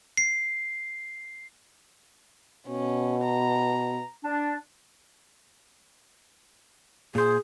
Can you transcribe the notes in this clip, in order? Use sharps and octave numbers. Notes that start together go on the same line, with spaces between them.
C7
B2 C#4
A#5
D4
A#2 G#4 C5